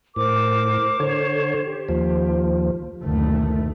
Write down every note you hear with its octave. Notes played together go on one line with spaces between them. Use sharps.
A2 A#4 C5 D6
D3 C5 C#5
G4
D#2 F3
F#1 D2 B2 D#3 A3